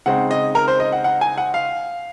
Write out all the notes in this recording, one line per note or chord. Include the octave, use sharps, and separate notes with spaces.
C#3 G#3 C4 D#4 F#5
D#5
A#4
C5
D#5
F#5
F#5
G#5
F#5
F5